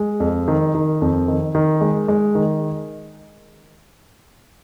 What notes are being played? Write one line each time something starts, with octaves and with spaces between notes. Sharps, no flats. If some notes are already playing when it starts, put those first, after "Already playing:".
Already playing: G#3
F2
D#3
D#3
F2
D#3
D#3
G#3
G#3
D#3